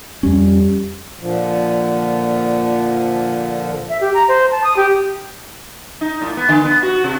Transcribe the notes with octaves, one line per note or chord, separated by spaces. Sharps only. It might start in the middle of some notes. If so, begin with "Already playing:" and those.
F2 G3 C#4
A#2 D3 F3
E5
G4
A#5
C5
A5
D#6
G4
D#4
A2
B3
D3
B3
F#4
C3